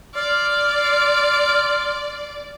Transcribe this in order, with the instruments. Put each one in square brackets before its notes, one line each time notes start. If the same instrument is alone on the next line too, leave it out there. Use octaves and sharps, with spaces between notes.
[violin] D5 [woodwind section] C6 F6